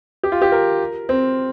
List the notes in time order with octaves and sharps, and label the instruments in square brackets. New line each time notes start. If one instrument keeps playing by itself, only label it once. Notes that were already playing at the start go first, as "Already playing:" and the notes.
[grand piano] G4
F4
G4
A#4
C4